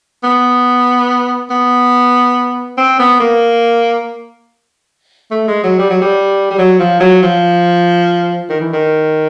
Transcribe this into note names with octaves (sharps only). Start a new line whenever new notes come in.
B3
B3
C4
B3
A#3
A3
G#3
F#3
G3
F#3
G3
G3
F#3
F3
F#3
F3
D#3
E3
D#3